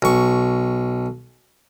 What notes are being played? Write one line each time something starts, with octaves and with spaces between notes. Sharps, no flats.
B1 C#6